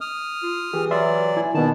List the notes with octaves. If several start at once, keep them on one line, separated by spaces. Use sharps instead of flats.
D#6 F6
F4
E3 G4 G#4
F#3 B4 D5 E5 C6
E4 G#5
B2 D#3 B3 A5